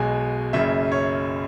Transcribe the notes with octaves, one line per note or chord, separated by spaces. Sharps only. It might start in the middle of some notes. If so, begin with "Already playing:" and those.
Already playing: B1 B2 G#3 G#5
F#1 F#2 C#3 E5
C#5